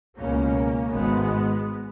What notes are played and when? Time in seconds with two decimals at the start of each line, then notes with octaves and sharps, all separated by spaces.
0.19 C#2 B2 A#3 C#4
0.91 G#1 G#2 G#3 B3